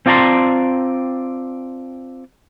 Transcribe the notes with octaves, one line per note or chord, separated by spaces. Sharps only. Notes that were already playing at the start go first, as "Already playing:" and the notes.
C4 F4 D5 A5 A#5 C6